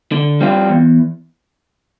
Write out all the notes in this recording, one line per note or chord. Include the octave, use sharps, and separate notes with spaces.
D3
G3 C4 F4
E2